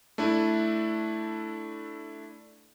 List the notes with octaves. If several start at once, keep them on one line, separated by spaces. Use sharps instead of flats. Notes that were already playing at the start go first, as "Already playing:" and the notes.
A3 D4 E4